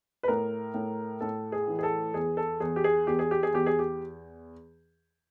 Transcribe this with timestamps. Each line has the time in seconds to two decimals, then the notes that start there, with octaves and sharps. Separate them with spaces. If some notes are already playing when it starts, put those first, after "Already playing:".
0.23 B4
0.28 A2 A#4
0.74 A2
1.21 A2 A4
1.52 G#4
1.68 E3
1.79 G#4
1.83 A4
2.14 E2 G#4
2.37 A4
2.60 E2 G#4
2.76 G4
2.84 G#4
3.07 E2 G4
3.19 G#4
3.31 G4
3.43 G#4
3.53 E2 G4
3.66 G#4
3.79 G4